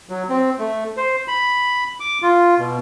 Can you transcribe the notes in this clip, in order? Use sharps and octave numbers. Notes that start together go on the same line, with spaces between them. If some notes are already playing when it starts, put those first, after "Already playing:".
F#3
C4
A3
C5
B5
D6
F4
B2